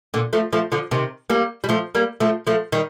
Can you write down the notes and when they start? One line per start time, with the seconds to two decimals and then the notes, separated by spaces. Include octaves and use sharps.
0.14 A#2 D3
0.33 F3 A3
0.53 F3 A3
0.72 D3 F3
0.91 C3 D#3
1.30 G3 A#3
1.64 G3
1.69 F3 A3
1.95 G3 A#3
2.20 F3 A3
2.47 F3 A3
2.72 D#3 G3